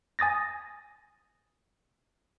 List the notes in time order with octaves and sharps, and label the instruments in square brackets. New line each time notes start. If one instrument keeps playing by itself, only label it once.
[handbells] G#5 D#6 A6 A#6